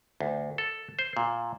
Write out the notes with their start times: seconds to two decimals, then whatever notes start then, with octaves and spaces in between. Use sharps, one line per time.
0.20 D2
0.58 A4
0.99 C5
1.17 A#2